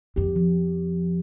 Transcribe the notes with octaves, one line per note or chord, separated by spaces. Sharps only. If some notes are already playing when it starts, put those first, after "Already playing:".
F2 G4
F3